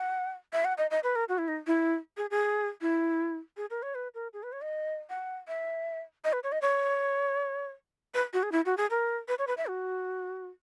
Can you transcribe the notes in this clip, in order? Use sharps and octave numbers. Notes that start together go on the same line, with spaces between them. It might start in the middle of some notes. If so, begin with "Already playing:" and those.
Already playing: F#5
E5
F#5
D#5
D#5
B4
A#4
F#4
E4
D#4
E4
G#4
G#4
E4
G#4
A#4
C#5
B4
A#4
G#4
B4
C#5
D#5
F#5
E5
D#5
B4
C#5
D#5
C#5
B4
F#4
G#4
E4
F#4
G#4
A#4
B4
C#5
B4
E5
F#4